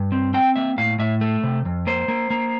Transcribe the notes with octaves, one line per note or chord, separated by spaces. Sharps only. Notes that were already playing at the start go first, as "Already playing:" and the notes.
Already playing: G2
C4
C4 G5
A#3 E5
A2 F5
A2 E5
A3
C3
F2
A#3 C5
A#3
A#3